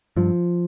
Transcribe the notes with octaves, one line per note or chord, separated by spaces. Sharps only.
G2 F3